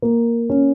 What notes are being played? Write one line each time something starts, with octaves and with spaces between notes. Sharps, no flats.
A#3
C#4